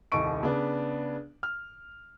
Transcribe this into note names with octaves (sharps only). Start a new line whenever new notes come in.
D#1 C2 D#5 C#6 D7
C#3 B3 D4
F6